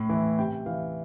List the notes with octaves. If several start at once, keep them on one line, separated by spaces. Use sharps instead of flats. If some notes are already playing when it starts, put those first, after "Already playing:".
Already playing: A2
E3
C3 G5
E3 F5